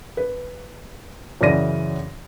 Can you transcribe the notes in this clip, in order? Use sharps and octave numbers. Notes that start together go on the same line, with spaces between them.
B4
F#2 C#3 E3 D5 A#6 D#7